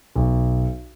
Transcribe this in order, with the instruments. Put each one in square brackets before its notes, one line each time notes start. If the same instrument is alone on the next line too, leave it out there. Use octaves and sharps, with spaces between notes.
[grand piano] B1